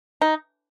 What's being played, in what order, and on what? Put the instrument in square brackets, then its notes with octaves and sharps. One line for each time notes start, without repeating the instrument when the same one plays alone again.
[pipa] D#4